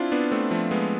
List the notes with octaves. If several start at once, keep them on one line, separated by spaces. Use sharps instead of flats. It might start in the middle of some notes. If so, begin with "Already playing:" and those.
Already playing: C4 D4 E4 F4
B3 D4
A3 C4
F3 A3
G#3 B3